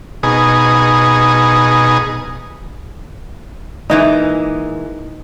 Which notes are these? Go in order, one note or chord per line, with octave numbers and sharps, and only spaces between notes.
B2 D#4 G#4
A#2 E3 G#3 D#4